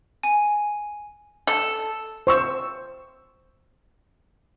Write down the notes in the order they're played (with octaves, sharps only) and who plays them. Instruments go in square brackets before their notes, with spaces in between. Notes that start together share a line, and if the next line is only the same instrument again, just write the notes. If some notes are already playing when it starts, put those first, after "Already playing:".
[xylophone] G#5
[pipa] A4
[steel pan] C5 C#6 E6